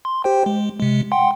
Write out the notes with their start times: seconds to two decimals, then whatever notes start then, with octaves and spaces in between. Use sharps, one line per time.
0.05 C6
0.24 G4 C5 G5
0.46 G#3
0.80 C3 G#3
1.12 F#5 G5 C6